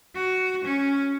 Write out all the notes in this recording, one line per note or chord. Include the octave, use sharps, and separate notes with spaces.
F#4
C#4